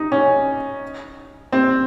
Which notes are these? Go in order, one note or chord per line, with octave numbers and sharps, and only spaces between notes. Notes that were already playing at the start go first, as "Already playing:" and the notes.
Already playing: D#4
C#4
C4